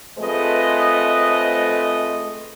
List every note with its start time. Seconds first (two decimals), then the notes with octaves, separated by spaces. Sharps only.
0.18 F3 G#3 A3 C4 B4 D#5